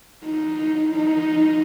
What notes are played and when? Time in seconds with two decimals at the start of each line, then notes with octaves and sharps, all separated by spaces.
0.25 D#4
0.95 D#4